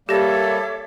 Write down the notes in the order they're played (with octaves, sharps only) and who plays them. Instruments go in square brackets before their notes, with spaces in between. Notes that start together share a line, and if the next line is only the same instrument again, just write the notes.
[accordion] G3 A#3 [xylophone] G4 A#6 [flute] A4 [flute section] C#5 E5 D6